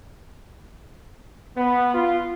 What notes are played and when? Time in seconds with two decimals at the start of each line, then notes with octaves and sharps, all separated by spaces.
1.56 B3
1.94 F4